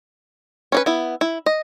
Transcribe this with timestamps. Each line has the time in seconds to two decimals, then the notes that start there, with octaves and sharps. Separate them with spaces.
0.72 C#4 D4 B4
0.86 B3 E4
1.21 E4
1.46 D#5